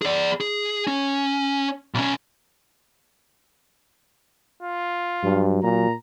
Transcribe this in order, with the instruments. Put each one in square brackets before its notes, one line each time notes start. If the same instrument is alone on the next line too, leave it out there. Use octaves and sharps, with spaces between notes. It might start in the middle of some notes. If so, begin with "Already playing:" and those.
[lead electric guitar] G#4 D5
G#4
C#4
B1 C#4
[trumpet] F4
[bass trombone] G2 [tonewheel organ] F#3
[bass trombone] A#2 [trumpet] A#5